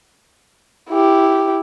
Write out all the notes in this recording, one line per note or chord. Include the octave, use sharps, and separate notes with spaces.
E4 G4